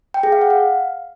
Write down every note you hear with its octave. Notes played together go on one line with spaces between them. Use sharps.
G5
G#4
F5
F#5
F5